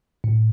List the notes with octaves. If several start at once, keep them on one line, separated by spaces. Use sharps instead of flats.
A2